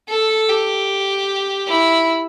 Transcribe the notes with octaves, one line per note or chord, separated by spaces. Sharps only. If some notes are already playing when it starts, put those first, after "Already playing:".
A4
G4
E4